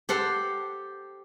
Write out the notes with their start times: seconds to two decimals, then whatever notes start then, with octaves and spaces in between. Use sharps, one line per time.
0.09 G4 A4 C5 F#5